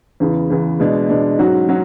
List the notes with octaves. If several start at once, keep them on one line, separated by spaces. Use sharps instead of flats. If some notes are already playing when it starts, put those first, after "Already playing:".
E2 C#3 E3
E2 C#3 E3
B2 G#3 D4
B2 G#3 D4
G#2 F#3 C#4 F#4
F#3 C#4 F#4